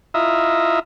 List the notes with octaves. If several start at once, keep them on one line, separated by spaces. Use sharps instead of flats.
E4 F4 D#5 E5 A#5